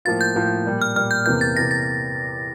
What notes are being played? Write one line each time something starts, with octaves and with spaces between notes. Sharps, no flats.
A2 F3 A#3 F4 A6
G6
A2 F3 A#3 F4
A#2 G3 A#3
F6
A#2 G3 A#3 F6
G6
E2 C3 E3 A#3 G6
A6
E2 C3 E3 A#3 A#6
A6